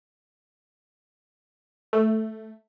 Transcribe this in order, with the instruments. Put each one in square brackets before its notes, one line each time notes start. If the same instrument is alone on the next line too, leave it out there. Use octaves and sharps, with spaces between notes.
[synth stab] A3